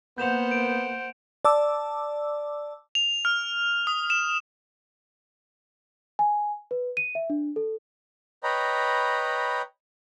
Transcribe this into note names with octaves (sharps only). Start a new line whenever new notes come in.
A#3 B3 C5 F#5 G6 E7 F7
D7
D5 A5 D6 E6
F7
F6
D#6
E7
G#5
B4
D#7
E5
D4
A4
B4 C#5 D#5 G5 A#5 B5